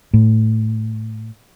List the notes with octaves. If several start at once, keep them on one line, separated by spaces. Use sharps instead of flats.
A2